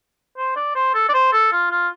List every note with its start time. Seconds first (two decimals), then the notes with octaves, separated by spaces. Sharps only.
0.38 C5
0.56 D5
0.76 C5
0.95 A4
1.09 D5
1.14 C5
1.33 A4
1.53 F4
1.71 F4